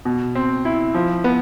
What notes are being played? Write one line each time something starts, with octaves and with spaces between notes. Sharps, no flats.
B2
C4
E4
F3
B3